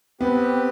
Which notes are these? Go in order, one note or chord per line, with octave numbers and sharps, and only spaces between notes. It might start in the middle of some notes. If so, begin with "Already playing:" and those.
B3 C4 G4 B4